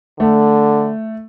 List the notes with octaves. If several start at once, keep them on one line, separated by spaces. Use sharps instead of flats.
D3 A3